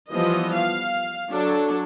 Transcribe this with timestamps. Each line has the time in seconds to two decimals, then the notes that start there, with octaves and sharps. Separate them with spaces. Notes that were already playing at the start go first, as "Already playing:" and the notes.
0.11 E3 F3 G3 B3 D#5
0.55 F5
1.30 F#3 D4 A4